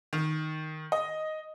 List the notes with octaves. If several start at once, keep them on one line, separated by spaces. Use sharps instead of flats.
D#3
D#5